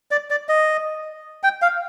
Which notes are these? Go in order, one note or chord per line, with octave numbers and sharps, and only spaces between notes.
D5
D5
D#5
G5
F5